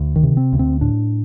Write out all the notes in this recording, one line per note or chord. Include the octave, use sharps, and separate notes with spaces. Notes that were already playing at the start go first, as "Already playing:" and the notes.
Already playing: D2
D#3
C3
C4
D2
C4
A2 D4